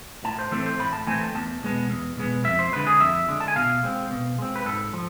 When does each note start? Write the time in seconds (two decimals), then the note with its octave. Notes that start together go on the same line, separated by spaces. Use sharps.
0.24 A2 A5
0.39 C5
0.52 E3 A3 C4 A4
0.66 C5
0.79 A2 B5
0.93 A5
1.07 E3 A3 C4 G#5
1.21 A5
1.35 E2 A5
1.63 B2 G#3 B3
1.90 E2
2.17 B2 G#3 B3
2.45 F2 E5
2.59 C5
2.73 D3 G#3 B4
2.87 G#4
3.00 F2 E5
3.28 D3 G#3
3.41 A5
3.48 G#5
3.56 B2 F5
3.83 G#3 C4
4.11 B2
4.38 G#3 C4
4.56 B4
4.66 G#2 A4
4.93 F3